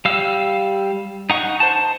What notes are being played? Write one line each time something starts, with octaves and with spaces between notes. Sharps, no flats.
G3 F5 E6
D#4 F#5 C#6
C5 A5